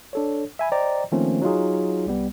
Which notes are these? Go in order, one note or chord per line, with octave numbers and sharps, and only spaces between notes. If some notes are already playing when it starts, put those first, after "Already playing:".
D4 A4 C#5
E5 G#5 B5
C5 D5 D#5 G5 A#5
D#3 F3 A3 A#3 C4 C#4
F#3 D#4 F4 G#4
C2 G3 B3